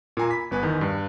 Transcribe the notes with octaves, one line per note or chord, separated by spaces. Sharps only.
A#2 A#3 G#5 A#5
B5 B6
G1 B3 B4 G#5
E2 D#3
G2